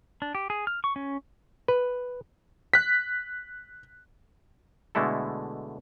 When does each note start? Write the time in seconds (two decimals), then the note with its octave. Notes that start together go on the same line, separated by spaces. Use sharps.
0.22 D4
0.35 G4
0.50 G#4
0.67 F6
0.84 C#6
0.96 C#4
1.68 B4
2.74 F#6 B6
4.95 B2 D3 G#3 A3 E4 A4